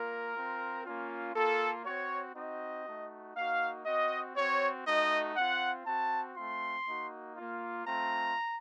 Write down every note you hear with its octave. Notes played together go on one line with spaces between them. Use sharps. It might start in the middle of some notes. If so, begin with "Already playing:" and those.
Already playing: A#3 F4 A#4
C4 F4
A#3 C#4 F4
A#3 F4 A4
C4 F#4 C#5
C4 D#4 F#4 D#5
A3 D#4 F#4
A#3 D#4 F#4 F5
C4 F#4 D#5
C4 F#4 C#5
A3 D#4 F#4 D#5
C4 F4 F#5
C4 F#4 A5
A3 C4 F4 C6
A#3 D#4 F#4
A#3 F4
A3 C4 F4 A#5